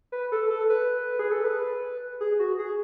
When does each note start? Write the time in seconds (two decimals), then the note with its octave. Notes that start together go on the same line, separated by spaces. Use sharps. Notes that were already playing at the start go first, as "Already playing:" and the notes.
0.12 B4
0.32 A4
0.50 A4
0.69 B4
1.19 G#4
1.31 A4
1.44 B4
2.21 G#4
2.39 F#4
2.59 G#4